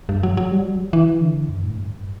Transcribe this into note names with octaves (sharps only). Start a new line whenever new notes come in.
G2
F#3
F#3
G3
F#3
E3
D3
F#2
A2
G2